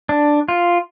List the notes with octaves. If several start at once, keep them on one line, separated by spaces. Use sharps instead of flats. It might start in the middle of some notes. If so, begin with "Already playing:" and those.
D4
F4